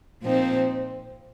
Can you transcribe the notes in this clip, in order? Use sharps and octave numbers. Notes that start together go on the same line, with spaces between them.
A#2 F3 C4 D#4